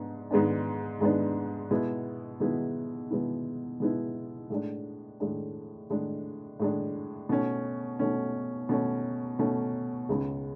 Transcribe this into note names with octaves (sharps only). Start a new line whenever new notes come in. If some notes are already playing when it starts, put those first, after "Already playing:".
Already playing: G#2 B3 D4
G#2 G#3 B3 D4
G#2 G#3 B3 D4
B2 G#3 B3 E4
B2 G#3 B3 E4
B2 G#3 B3 E4
B2 G#3 B3 E4
A2 G#3 D4
A2 G#3 D4
A2 G#3 D4
A2 G#3 D4
B2 A3 C#4
B2 A3 C#4
B2 A3 C#4
B2 A3 C#4
C#2 C#3 G#3